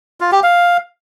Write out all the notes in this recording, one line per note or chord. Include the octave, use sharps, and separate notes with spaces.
F4
G4
F5